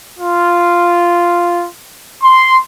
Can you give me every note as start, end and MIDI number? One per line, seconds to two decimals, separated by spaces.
0.19 1.65 65
2.22 2.58 84